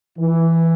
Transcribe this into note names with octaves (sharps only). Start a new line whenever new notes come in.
E3